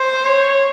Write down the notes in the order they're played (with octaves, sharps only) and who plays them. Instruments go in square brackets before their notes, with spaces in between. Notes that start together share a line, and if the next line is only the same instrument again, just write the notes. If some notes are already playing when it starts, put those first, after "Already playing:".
Already playing: [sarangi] C5
C#5